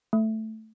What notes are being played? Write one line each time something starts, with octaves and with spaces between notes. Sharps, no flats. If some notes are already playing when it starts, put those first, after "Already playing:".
A3